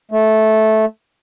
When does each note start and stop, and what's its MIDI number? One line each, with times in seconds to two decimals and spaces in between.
0.11 0.85 57